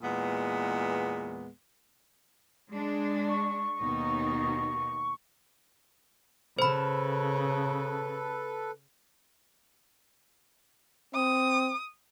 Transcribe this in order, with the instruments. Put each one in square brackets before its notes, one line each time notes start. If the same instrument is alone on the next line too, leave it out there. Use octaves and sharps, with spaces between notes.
[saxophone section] E2 A#2 G#3 B3
[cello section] G#3 D4
[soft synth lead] C#6
[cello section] D#2 B2 D#4
[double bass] C#3 [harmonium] A4 B4 [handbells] C5 B5
[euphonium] C4 [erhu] D#6